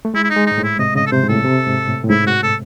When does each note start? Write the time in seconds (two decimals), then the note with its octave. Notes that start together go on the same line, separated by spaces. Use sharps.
0.05 A3
0.14 G#3 E4
0.24 E4
0.30 D#4
0.36 G#3
0.46 D#4
0.51 G#2
0.58 A2
0.64 E4
0.79 C3 D#5
0.95 C#3 D#5
1.06 A4
1.12 C3 C5
1.23 G#2
1.29 A2 A4
1.45 C3
1.66 G#2
1.88 A2
2.04 A2
2.10 G#2 E4
2.27 F#4
2.43 A4